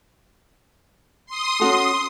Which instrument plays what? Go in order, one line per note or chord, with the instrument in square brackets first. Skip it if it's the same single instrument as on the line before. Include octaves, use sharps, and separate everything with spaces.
[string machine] C6 D#6
[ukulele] C#4 F#4 A4